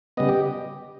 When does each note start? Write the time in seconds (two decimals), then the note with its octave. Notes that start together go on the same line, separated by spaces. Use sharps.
0.17 C#3 G3 B3 D#5
0.29 G4